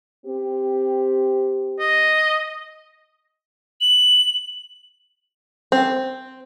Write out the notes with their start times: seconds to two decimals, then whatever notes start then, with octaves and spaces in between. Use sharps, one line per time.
0.26 C4 G4
1.80 D#5
3.81 F#7
5.72 C4